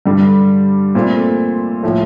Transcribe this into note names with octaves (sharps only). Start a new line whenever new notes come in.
G2 D3 G3
A#2 A3 C4
A2 F3 A3